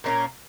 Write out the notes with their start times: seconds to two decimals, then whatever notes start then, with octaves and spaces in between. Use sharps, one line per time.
0.04 A#2 A#3 C#4 A#4